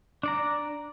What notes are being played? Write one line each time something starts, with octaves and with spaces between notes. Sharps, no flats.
D4 D5 A#5